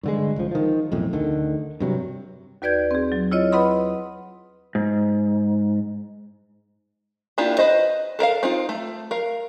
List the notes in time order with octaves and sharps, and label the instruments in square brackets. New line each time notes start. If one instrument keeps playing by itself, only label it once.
[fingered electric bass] G2 D3 G#3
C#2 F3
D#3 F3
B1 F2 A2
D2 D3 D#3
G2 C3 F#3
[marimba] D#2 F#4 B4 D5 G6 G#6
C4 G#4
F#3
E4 F4 C#5 D#5
B4 D#5 F#5 B5 C6 D#6
[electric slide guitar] G#2
[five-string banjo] A#3 D4 E4 F4 G4
B4 C5 D#5
A4 A#4 E5 F5
C4 D#4 F4
A3
A#4 F5